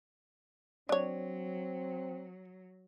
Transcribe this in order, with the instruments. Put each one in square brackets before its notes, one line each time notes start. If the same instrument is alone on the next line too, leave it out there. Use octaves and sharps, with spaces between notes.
[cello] F#3 [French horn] C4 [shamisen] D4 C#5